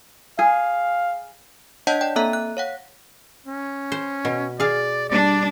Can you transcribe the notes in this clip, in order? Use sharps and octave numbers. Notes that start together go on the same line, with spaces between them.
G#4 F5
D4 C#5 D#5 F#5 A5 G6
D5 G5
A#3 C4 A4 E5 A#5
F#6
C#5 F5 F#5
C#4
C5
B2
G#4 D5 F5
G3 D4 D5